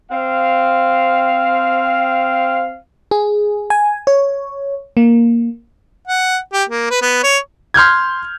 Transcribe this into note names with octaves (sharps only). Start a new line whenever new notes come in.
C4 F5
G#4
G#5
C#5
A#3
F#5
G4
A#3
B4
B3
C#5
C6 F6 G6 G#6